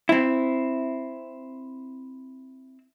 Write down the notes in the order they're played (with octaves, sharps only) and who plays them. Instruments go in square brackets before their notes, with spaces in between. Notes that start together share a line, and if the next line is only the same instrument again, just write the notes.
[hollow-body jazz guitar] C4 E4